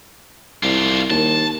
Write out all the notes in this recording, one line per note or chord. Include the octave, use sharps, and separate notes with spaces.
C2 F4 G4
D#2 A5